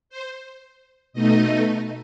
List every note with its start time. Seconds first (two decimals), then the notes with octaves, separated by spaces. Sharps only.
0.09 C5
1.13 B2 A3 D#4 D#5